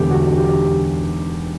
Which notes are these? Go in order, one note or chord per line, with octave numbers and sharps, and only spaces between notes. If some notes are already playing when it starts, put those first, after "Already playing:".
Already playing: E1 E2 D3 G4
F#4
G4